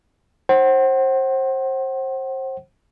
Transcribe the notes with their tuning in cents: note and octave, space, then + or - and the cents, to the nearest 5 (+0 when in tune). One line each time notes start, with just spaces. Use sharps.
C5 +30 F#5 +35